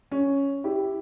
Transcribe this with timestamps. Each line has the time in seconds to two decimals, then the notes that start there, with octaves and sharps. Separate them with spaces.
0.12 C#4
0.64 E4 G4